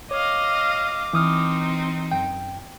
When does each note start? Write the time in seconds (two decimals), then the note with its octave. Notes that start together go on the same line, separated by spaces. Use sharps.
0.11 C#5 D#5 F5 D6
1.13 E3 C4 D#4 D#6 F6
2.12 F#2 G5